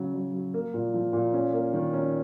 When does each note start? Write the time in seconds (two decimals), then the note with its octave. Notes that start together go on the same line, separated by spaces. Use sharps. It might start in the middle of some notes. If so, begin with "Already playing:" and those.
Already playing: C#3 F#3
0.14 F#3
0.34 F#3
0.54 A#3
0.74 A#2
0.94 F3
1.13 A#2
1.33 C#4
1.53 A#3
1.74 D#3
1.93 C#4